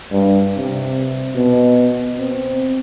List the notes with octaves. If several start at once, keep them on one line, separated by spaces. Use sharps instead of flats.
G2
C3
B2
C4